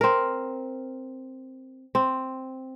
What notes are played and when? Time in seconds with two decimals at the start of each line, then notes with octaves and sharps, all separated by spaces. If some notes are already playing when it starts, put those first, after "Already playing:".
0.01 C4 A#4
1.95 C4